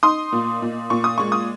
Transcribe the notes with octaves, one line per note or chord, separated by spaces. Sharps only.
D#4 C6 D#6
A#2
A#2
A#2 C#6
D#6
G#3 C#6
D#6